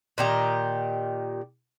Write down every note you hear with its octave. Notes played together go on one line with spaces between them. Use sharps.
A#2 D#3 G4